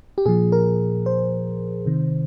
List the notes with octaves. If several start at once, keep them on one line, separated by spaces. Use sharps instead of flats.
G4
A#2 F3 G#4
A#4
C5
C3 D#3